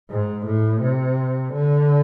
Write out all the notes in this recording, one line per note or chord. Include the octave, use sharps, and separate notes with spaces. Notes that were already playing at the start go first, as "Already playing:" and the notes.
G#2
A2
C3
D3